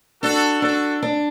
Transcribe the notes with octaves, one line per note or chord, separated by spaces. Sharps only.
D4 F#4 A4
D4 F#4 A4
D4